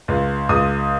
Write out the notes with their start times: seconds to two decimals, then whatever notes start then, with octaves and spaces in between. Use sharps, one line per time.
0.08 C#2
0.49 C#2 D#6